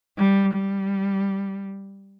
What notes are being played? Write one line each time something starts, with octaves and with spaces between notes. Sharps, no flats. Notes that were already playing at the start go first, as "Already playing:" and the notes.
G3
G3